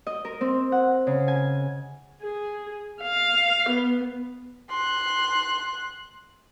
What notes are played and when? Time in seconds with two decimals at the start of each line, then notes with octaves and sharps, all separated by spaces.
0.07 D#5
0.25 A#4
0.41 C4
0.72 F#5
1.07 C#3
1.28 G#5
2.23 G#4
3.02 F5
3.69 B3
4.69 C6 F#6